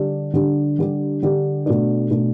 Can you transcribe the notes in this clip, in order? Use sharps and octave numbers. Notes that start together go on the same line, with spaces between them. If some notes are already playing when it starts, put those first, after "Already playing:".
Already playing: D3 G3 D4 G4
D3 G3 D4 G4
D3 G3 D4 G4
D3 G3 D4 G4
B2 A3 D4
B2 A3 D4